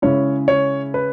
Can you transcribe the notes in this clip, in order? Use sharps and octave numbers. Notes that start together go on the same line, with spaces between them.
C#3 G#3 C#4 E4 C#5
C#5
B4